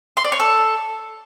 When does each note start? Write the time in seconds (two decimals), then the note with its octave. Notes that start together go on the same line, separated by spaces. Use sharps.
0.17 C6
0.24 D5
0.32 C#5
0.40 A4